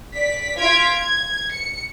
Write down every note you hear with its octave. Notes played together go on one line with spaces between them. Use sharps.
D5 B6
F4 G#6 B6 D7
G#6
C#7